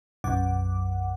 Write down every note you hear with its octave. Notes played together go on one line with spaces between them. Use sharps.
B1 F#2 F#5 D6